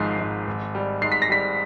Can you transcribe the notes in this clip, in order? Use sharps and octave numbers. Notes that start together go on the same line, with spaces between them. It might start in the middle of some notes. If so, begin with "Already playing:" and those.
Already playing: G#1 G#2 F3 C7
G#2
G#1
G3
G#2 C7
B6
A#6
G3 B6